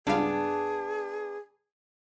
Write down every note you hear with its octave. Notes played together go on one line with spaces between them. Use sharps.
C#2 G2 B3 D4 G#4 F5